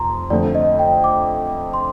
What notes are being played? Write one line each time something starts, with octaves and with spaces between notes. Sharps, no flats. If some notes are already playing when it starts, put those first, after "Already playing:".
Already playing: F1 F2 A#5 C6
F2 D3 A3 D5
D#5
G5
D6
C6